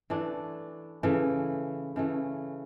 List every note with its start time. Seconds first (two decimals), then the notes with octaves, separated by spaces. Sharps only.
0.10 E3 A3 D4
1.03 C#3 E3 A3
1.96 C#3 E3 A3